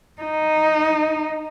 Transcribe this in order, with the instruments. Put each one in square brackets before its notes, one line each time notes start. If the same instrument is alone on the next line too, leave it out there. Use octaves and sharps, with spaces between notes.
[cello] D#4